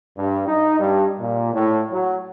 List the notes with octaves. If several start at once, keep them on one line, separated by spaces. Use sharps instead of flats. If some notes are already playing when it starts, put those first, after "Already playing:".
G2
D#4
G2
A#2
A2
F#3